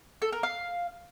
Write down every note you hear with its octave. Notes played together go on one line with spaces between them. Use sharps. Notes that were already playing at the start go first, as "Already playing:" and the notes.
A4
A#4
F5